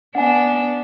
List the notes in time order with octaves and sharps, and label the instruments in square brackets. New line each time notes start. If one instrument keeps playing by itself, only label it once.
[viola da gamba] B3 D4 [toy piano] F#5 G#5